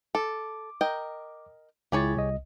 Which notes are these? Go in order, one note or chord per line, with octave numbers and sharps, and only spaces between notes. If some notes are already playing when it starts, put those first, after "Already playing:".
A4 D6
A#4 D#5 G5
C#2 E4 G4 G#4 C#5 A6
C2 D#5